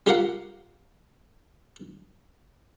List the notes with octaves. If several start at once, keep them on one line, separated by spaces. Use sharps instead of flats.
G3 F4 G4 A#4 F5 F#5